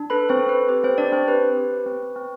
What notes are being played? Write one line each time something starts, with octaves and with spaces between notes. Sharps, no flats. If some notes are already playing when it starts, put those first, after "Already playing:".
Already playing: D4
A4 B4 B5
C4 C5
A4
B4
G4 B4
C4 C5
D4 G4 D5
C4 C5
G4 B4
G4
C4
C4